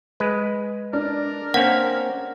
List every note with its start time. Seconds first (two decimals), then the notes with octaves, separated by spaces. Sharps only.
0.20 G#3 B4
0.93 D4 A#4
1.54 A#3 C4 C#4 F#5